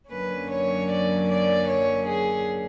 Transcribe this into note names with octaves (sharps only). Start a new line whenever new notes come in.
F#2 D3 F#3 A#3 C#4 B4
C#5
D5
D5
C#5
G#4